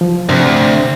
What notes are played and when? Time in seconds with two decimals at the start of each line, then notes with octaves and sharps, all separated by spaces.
0.01 F3
0.29 D2 C3 D4 C5 E5